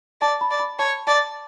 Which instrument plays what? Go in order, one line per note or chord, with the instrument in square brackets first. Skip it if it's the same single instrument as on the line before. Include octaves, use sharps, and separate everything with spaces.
[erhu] D5 [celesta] A5
[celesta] B5
[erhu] D5
[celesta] B5
[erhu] C#5 [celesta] A5
[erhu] D5 [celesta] A5